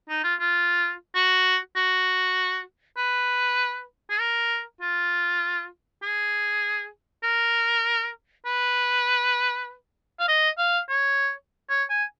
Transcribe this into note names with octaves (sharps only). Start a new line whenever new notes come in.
D#4
F4
F4
F#4
F#4
B4
G#4
A#4
F4
G#4
A#4
B4
F5
D#5
F5
C#5
C#5
G#5